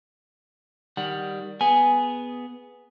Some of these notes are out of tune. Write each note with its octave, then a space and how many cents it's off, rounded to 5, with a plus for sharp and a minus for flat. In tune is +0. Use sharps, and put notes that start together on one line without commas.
D#3 +0 G3 +0 F#5 +0
B3 +0 G#4 +0 G#5 +0